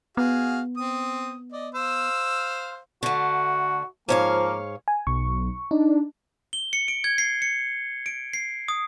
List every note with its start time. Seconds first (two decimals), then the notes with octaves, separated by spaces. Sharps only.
0.17 B3 F#4 G#4 F5
0.77 C4 D#6
1.52 D5 D#5
1.75 C5 F5 E6
3.03 D3 A3 F#4
4.09 G#2 F3 A#3 C#5 F5
4.88 G#5
5.07 B1 C#6
5.71 D4 D#4
6.53 G7
6.73 C#7
6.88 D7
7.04 G#6
7.18 C7
7.42 C#7
8.06 D7
8.33 C7
8.68 D#6